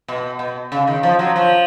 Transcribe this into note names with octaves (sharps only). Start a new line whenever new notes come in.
B2
B2
C#3
D#3
F3
F#3
F3